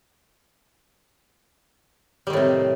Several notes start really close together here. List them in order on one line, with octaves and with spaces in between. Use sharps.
G3 D#3 A2 C3